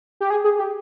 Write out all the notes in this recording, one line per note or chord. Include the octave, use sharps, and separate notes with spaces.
G4
G#4
G#4
G4